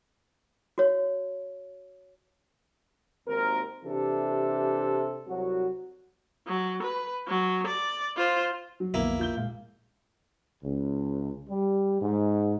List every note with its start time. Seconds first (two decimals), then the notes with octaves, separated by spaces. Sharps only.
0.78 F#4 C#5
3.27 G#1 D#2 C4 A#4
3.84 C3 E3 D4 G4 A4
5.28 C2 F#3 F#4
6.47 F#3
6.83 B4
7.28 F#3
7.67 D5
8.17 F4 C5
8.80 F#3 F#4
8.94 B1 F2 D3 F3 A#3 B3 E4
9.19 F4 G6 G7
9.37 A#2 G#3 F5
10.63 C#2
11.49 G3
12.00 G#2